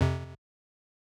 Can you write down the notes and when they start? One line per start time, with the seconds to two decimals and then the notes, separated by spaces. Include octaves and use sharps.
0.01 F2 C3